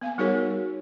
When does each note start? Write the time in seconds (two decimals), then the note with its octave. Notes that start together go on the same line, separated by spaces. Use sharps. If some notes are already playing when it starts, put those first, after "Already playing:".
0.01 B3 F5 G#5
0.18 G3 D#4 F#4 G#4 A#4 C#5